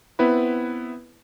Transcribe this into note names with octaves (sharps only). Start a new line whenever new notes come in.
B3 C4 E4 B4 B5